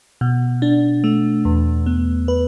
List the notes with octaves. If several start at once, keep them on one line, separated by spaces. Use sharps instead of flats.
B2
D4
A3
E2
B3
B4